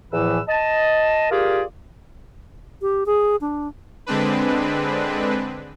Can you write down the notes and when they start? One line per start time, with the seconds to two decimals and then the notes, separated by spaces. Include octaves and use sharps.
0.11 E2 A2 E3 F3 B4 E6
0.48 D#5 A5
1.30 F4 G4 G#4 A#4 D5
2.81 G4
3.06 G#4
3.41 D4
4.06 D3 G#3 C4 D4 B4